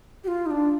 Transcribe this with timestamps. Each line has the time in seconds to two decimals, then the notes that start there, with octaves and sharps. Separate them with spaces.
0.24 G4
0.28 F4
0.46 D#4
0.51 D4